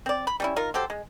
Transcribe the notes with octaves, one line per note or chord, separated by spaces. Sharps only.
C4 D5
B5
G3 C#4 E4
D#4 F4 A#4
F#3 G4 A4 C5
G#3